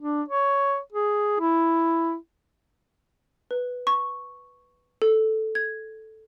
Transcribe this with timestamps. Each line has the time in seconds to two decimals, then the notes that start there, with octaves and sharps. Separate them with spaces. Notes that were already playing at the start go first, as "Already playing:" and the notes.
0.01 D4
0.28 C#5
0.92 G#4
1.40 E4
3.51 B4
3.87 C#6
5.02 A4
5.55 G#6